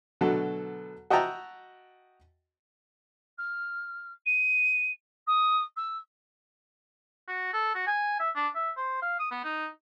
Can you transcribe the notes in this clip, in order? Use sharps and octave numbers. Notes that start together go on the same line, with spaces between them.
B2 D3 F#3 A3 A4
F#4 D#5 E5 G5 A5 A#5
F6
D#7
D#6
E6
F#4
A4
F#4
G#5
E5
D4
E5
C5
F5
D#6
B3
D#4